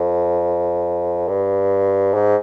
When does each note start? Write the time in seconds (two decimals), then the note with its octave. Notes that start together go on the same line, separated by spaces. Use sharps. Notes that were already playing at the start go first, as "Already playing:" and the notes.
Already playing: F2
1.28 G2
2.14 G#2